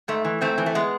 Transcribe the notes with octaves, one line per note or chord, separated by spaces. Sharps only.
G#2 A3
E3
G#2 A3 C4
E3
A3
G#3 B3